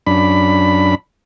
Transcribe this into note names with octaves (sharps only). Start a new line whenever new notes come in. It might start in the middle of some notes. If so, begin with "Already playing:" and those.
F#2 D4 B5